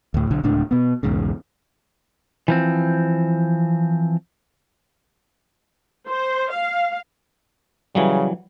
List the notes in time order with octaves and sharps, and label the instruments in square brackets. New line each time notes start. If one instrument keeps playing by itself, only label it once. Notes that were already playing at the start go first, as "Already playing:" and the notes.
[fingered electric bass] D2 A2
B1 D3
D1 C#2 A2 D4
B2 B3
B1 E2 G#2 C#3
[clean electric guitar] E3 F3 C4
[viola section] C5
F5
[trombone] C#3 [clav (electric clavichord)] E3 F#3 G3